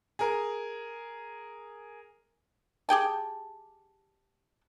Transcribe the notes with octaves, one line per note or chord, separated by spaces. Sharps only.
G#4 A#4
G4 G#4 G5 A5